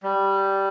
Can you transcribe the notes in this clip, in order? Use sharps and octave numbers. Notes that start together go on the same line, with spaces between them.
G3